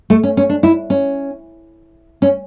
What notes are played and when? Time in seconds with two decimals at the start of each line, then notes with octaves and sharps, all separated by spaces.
0.10 A3
0.23 C#4
0.37 C#4
0.50 D4
0.63 E4
0.90 C#4
2.22 C#4